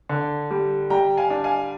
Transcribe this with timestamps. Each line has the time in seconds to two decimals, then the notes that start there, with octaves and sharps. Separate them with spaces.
0.09 D3
0.50 G3
0.90 G3 G5 A#5
1.17 F5 G#5
1.30 D4
1.44 F5 G#5